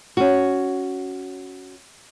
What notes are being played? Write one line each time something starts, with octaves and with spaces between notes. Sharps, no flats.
C#4 F#4